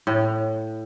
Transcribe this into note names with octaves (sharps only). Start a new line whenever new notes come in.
A2